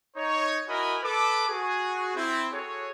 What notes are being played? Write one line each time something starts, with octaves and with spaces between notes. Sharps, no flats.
D#4 C#5
E4 F#4 A#4 D#5 G#5 B5
A4 B4 D6
F#4 G#4
C4 E4
F#4 G#4 A4 C#5